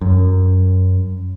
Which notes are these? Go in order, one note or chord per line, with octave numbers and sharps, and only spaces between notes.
F#2